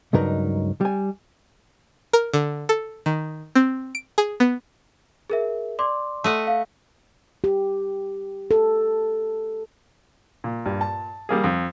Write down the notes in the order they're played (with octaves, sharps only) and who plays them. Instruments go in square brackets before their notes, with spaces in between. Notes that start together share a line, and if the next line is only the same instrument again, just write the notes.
[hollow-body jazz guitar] C#2 G2 F#3 D#4 A#4 B4
G3 G#5
[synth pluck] A#4
D3
A4
D#3
C4
D7
G#4
B3
[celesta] G#4 A#4 E5
D5 C6 D6
[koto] A3 D#5 F#5
[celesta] F5
[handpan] G4
A4
[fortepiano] A#2
[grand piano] G2
A5
[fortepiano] G3 A#3 G#4
F2